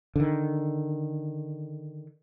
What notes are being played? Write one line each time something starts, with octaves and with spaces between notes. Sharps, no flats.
D3 D#3